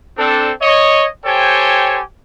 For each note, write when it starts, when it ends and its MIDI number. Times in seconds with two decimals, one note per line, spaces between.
0.17 0.51 60
0.17 0.51 62
0.17 0.51 69
0.62 1.06 73
0.62 1.06 75
1.25 1.99 67
1.25 1.99 69
1.25 1.99 72
1.25 1.99 73
1.25 1.99 79
1.25 1.99 80